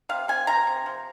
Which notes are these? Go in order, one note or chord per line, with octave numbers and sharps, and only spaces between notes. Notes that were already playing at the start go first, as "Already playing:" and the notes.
C3 F5
C3 G#5
F3 A#5
C3
F3